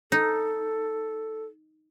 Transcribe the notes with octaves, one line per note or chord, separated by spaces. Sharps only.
D#4 A4